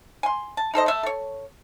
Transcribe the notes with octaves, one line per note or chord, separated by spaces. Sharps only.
G#5 C6
A5
D#4 A4 C5 D#5
A3 E5
A4 C#5